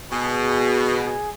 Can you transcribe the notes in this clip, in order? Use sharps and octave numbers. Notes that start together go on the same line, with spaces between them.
B2 G#4